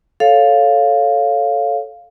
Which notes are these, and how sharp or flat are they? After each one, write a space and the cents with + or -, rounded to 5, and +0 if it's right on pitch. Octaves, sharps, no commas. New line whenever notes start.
A4 +0 C#5 +0 F5 +0